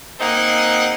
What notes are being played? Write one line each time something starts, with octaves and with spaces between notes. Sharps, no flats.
A#3 C4 D#4 G#4 F#5